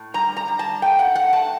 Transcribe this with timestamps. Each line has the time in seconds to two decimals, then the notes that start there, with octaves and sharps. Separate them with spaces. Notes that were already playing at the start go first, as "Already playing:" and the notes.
Already playing: A2
0.14 G3 A#5
0.37 A#5
0.48 G3
0.59 A5
0.82 A3 G5
0.99 F#5
1.15 A3 F#5
1.33 A5